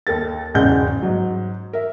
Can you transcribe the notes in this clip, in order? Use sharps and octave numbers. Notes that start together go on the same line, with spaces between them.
D#2 A4 A#4 A6
E1 A1 G#2 C#3 F#5 G6
G#2 F#3
A#4 E5